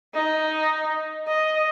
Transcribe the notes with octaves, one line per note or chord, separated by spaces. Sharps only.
D#4
D#5